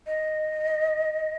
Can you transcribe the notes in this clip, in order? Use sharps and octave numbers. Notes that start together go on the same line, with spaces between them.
D#5